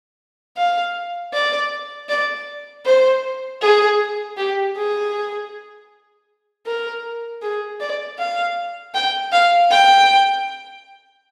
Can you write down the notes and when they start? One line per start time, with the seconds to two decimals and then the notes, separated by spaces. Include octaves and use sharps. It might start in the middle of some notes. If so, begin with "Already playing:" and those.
0.57 F5
1.33 D5
2.09 D5
2.85 C5
3.62 G#4
4.37 G4
4.76 G#4
6.66 A#4
7.42 G#4
7.80 D5
8.19 F5
8.94 G5
9.32 F5
9.71 G5